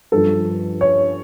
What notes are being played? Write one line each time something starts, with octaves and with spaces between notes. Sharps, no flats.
G2 F3 A4
C#5